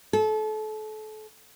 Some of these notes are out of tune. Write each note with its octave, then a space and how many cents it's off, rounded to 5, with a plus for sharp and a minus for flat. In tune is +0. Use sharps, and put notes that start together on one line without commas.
A4 -30